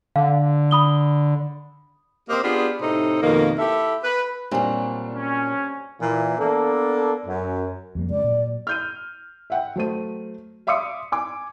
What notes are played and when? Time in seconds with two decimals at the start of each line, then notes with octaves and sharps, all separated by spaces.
0.16 D3 F5
0.71 B5 D#6 G7
2.30 A#3 C4 G4 C5 D#5
2.44 B3 D4 F4 G4 G#4
2.82 A2 C3 D#4 A4 C5
3.23 F2 B2 D#3 A#3
3.59 E4 G4 A4 E5
4.04 B4
4.51 A#2 F#3 G3 C4 D4
5.14 C#4
6.00 A#2 E3
6.38 A#3 B3 D4 A4
7.26 F#2
7.95 F2 G3 A#3
8.10 C#3 G#3 D5
8.24 A#2 F#3
8.67 F6 G6 D#7
9.50 E5 F#5 G5
9.76 F#3 A3 C5 D#7
10.67 E5 F5 C6 D6 D#6 C#7
11.12 G#5 D6